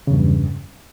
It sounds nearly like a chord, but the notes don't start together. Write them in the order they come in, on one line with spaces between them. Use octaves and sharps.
C#3 E2 G2